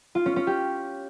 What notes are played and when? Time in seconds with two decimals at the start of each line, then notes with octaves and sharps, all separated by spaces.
0.15 F4
0.26 C#4
0.36 C#4
0.47 G4